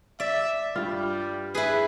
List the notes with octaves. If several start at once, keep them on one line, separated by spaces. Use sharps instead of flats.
D5 E5
G2 G3 F4
E4 G#4 B4